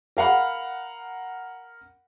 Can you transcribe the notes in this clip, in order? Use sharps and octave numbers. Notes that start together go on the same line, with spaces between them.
A#4 F5 F#5 B5